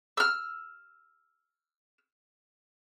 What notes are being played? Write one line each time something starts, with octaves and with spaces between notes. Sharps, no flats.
E6 F6